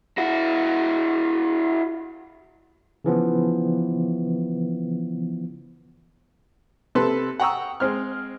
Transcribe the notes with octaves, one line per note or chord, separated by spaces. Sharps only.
E4 F#4
C#3 E3 F3 B3
C3 A4 B4 C6
F#5 G5 A#5 C#6 D#6 E6
G#3 C4 F6